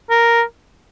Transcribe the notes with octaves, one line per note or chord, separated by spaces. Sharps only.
A#4